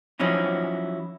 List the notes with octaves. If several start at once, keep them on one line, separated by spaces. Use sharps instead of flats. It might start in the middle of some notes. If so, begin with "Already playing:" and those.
F3 F#3 C#4 D#4 E4